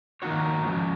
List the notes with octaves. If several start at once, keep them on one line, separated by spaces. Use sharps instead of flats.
D#3 A#3 D#4 F#4 C#5
F3 G#3 C#4